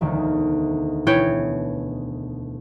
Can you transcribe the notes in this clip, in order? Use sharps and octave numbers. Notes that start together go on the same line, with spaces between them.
E1 D2 D#3
B2 E3 C#5 G5